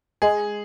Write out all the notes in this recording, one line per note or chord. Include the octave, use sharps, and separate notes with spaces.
G#3 G#4